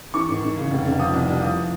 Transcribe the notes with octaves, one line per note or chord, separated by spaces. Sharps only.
E3 C#6
G#1
G#1
C#3
F1
F1
F3 D#6
C2
C2
F3 D#6